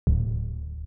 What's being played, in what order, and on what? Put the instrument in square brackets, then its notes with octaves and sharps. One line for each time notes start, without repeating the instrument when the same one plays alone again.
[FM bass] D1